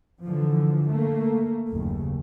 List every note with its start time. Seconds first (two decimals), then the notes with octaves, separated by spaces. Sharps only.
0.22 D3 E3 F3
0.87 A3 A#3
1.70 F#1 D#2 C#3